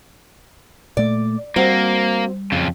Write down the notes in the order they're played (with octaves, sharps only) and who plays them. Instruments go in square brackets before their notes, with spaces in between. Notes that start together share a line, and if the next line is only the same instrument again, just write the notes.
[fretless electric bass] A#2 A3 [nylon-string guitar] D5
[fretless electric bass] G3 [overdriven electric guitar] A#3 [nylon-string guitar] C4 F#4 C5
[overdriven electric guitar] F2 C#3